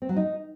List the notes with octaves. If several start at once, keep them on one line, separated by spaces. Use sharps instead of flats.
C4
F#3
D#4